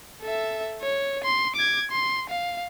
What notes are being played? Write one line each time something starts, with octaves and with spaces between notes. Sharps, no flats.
A4 E5
C#5
C6
D6 G#6
C6
F5